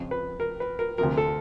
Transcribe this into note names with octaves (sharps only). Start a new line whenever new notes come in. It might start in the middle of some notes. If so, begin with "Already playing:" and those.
Already playing: F2 C#3 F3
B4
A#4
B4
A#4
D2 C3 F3 A#4
A4